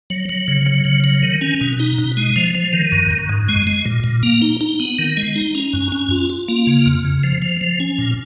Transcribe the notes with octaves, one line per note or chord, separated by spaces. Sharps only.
F#3
F#3
C#3
F#3
C#3
F#3
D#3
C#4
B2
D#4
B2
G#3
F3
F3
D#3
F#2
F#2
G#2
G#3
G#3
A#2
A#2
A#3
D#4
D#4
B3
D#3
G#3
D#4
C#4
F#2
C#4
F4
F4
A#3
C#3
F2
C#3
F3
F3
F3
C#4
A#2